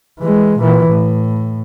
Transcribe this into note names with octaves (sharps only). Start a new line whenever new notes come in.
E3 G#3
A#2 E3
A2